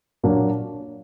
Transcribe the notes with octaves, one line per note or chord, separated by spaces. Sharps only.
A#2 F#3 A#3 D4